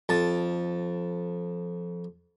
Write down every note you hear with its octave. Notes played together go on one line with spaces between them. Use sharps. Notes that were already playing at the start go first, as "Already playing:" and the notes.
F2 A5